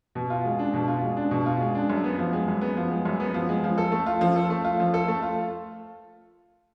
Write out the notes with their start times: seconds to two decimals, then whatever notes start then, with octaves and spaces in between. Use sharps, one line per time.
0.15 B2
0.30 F4
0.44 G#3
0.59 D4
0.73 B2
0.88 F4
1.03 G#3
1.17 D4
1.31 B2
1.46 F4
1.61 G#3
1.75 D4
1.90 F#2
2.04 B3
2.19 F3
2.33 G#3
2.48 F#2
2.61 B3
2.77 F3
2.91 G#3
3.05 F#2
3.20 B3
3.34 F3
3.49 G#3
3.64 F3
3.78 A4
3.92 A3
4.06 F4
4.21 F3
4.36 A4
4.50 A3
4.64 F4
4.80 F3
4.94 A4
5.08 A3
5.22 F4